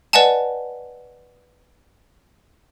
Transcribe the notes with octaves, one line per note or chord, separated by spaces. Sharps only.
B4 D5 D#5 F#5 G#5 A5